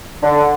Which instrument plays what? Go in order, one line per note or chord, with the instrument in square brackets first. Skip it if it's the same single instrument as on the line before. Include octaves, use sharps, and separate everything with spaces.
[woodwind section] D3